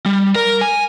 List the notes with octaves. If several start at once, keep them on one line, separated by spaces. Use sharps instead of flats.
G3
A#4
G#5